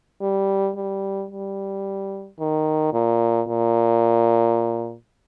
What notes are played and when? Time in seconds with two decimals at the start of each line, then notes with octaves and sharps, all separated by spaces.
0.21 G3
0.76 G3
1.31 G3
2.39 D#3
2.93 A#2
3.48 A#2